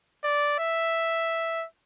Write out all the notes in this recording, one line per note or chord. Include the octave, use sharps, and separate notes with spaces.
D5
E5